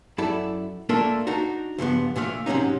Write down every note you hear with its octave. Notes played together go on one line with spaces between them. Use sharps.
F#2 E4 A4 D5
A3 A#3 D4 F4 A4 A#4
D4 D#4 F#4
C#2 G2 F3 B3
A#2 D3 A3 F5
G#2 C3 F#3 C#4 D#4